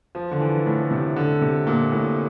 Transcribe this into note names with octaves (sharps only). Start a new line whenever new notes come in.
F3
D3
E3
A2
C3
D3
C3
A#2
A2